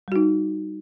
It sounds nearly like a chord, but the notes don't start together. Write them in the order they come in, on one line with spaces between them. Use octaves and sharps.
G3 F#4 D#4